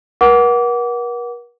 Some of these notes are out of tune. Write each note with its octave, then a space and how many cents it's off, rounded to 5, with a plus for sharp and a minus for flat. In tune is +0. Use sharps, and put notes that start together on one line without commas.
A#4 +45 F#5 +0 D6 -25